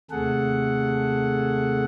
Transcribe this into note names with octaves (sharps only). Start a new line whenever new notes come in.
D#2 C3 A3 G#4 A4 F#5